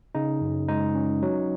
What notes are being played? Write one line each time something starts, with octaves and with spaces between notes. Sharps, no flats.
C#3 D#4
F#2
G#3 D#4
C#4
F#3